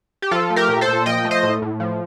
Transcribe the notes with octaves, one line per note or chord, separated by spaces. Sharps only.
G4
F3 F4 A4
A3
G4 A#4
A#2
A4 C5
A#2
F3 D#5 G5
A3
C5 D#5
A2
A2
F3